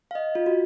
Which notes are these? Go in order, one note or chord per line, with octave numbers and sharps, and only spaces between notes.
F5
D#5
F4
F#4